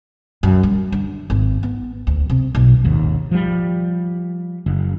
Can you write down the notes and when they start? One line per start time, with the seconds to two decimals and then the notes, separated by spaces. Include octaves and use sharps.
0.43 F#2
0.63 G3
0.92 D3
1.30 G#1
1.63 B3
2.07 D2
2.30 C3
2.55 B1
2.84 D#1 G#1 D#2
3.31 F3 G3
4.66 F#1